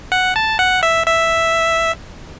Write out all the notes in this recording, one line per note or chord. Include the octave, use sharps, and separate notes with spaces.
F#5
A5
F#5
E5
E5